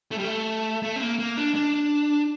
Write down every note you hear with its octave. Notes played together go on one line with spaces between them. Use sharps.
A3
G3
A3
A3
C4
A#3
A#3
D4
D4